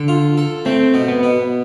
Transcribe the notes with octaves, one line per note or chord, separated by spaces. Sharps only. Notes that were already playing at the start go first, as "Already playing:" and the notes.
Already playing: D3 A4
F4
A4
A3 C4
B2
B3
B2